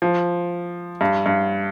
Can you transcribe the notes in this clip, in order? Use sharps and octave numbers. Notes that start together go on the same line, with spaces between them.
F3
G2
G2